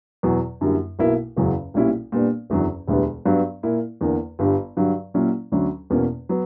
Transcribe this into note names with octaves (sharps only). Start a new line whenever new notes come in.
E2 B2 F#3
F#2 D3 G3 A#3 E4
B1 B2 A#3 E4
F#1 E2 C#3 F#3
B1 A#2 G3 C#4 E4
A#2 G3 B3 D4
F#1 E2 D3 F#3
E1 D2 D3 G3 B3
G2 F#3 B3 D4
A#2 A#3 E4
E2 D3 A#3
G1 G2 D3 G3
G2 D3 F#3
A#2 F#3 C#4 E4
D2 D3 F#3 C#4
E2 B2 A#3 C#4
F#3 B3